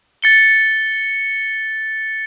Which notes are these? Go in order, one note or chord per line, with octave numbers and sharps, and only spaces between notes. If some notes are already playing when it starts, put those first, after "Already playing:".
A6 C#7 G7